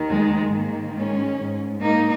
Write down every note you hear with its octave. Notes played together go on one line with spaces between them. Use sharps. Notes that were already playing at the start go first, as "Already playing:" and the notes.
Already playing: D#2 D#3
G#3
G#2 D#3 G#3 A#3
G#3 C#4
G#2 G#3
A#3 D#4